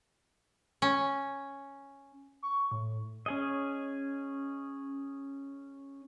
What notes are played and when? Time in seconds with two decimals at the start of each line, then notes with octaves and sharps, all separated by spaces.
0.82 C#4
2.43 C#6
2.71 A2
3.26 C#4 G#4 D#5